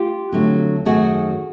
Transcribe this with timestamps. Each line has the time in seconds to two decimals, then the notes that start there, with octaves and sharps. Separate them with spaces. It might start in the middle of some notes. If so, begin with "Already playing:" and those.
Already playing: F4 G4
0.32 F2 D3 F#3 A3
0.85 F#2 D#3 F#3 A3 F#4 G#4